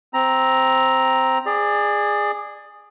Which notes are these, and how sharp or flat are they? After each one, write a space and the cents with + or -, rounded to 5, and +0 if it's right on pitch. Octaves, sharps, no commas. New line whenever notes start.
C4 +0 A#5 +5
G#4 -10 D5 +20